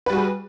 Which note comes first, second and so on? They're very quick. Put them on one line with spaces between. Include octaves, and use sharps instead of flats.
B4 G3 F#4 G#4